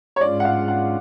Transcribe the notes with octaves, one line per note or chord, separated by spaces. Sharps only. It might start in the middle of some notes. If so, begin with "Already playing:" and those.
C#5
G#2 G#3 C#4 F4 D5
F#5
F5
F#5